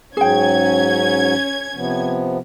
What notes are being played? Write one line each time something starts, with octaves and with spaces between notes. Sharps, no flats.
G#2 F#3 C#4 G#4 G5 G#6
C3 F3 B3